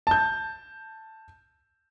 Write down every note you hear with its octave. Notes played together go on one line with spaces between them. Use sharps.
A5 G6